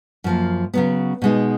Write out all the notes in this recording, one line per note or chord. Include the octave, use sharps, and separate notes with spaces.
F#2 F3 A#3
C#3 F#3 B3
B2 G#3 B3 D#4